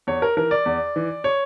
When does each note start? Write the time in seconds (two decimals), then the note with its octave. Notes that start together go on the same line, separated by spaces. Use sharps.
0.07 E2 C#5
0.22 A#4
0.37 E3 A#4
0.51 D5
0.66 E2
0.96 E3
1.24 C#5